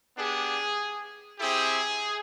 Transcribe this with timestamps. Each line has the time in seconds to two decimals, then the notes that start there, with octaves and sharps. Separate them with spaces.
0.16 B3 D4 G4 G#4
1.38 C4 E4 G4 G#4